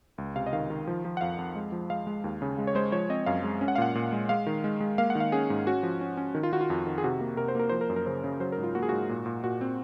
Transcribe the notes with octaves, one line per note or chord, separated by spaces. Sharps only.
C#2
C3 F5
D#5
D#3 F5
D#3
F3
F3
F#5
F2 F5
F2
G#3
F3
G#3 F5
G#3
D#2
C#3
G#3
C#5
G#3 C5
F3 C#5
C4 D#5
F#2 F5
G#3
C#4
F#5
F5
A#2 F#5
A#2
G#3
G#3 F5
D#3
G#3
G#3
A#3 F5
F#5
D#3
F5
C#4 G#4
G#2
C#4 F#4
F3
C#4
C#4
D#3
F4
D#3 F#4
F4
F2
D#3
G#4
C3 F#4
A#3
C3 A#4
C5
A#3 A#4
F3 C5
A#4
F#2
A#4
C#3 C5
C#3
F#3 C5
A#4
G#2
F4
A#3 F#4
G#4
G#2 F#4
A#2
A#2
A#2 F#4
C4